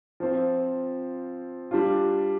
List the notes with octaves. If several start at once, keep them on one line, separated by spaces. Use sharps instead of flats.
F3 C4 F4
G3 D4 F4